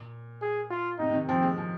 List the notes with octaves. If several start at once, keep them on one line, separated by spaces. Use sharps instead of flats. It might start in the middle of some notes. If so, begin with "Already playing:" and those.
Already playing: A#2
G#4
F4
C3 D#4
C3
D#3
F3 C4
G#3
F3